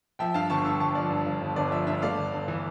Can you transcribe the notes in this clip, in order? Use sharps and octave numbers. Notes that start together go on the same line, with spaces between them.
F3 E5 G5
G2 F5 A5
G1 A5 C#6
G2 C#6 E6
G1 A5 C#6
F3 D5
G2
G1
G1
G1 D5
F3 E5
G2 E5
A3 D5 F5
G1
G1
E3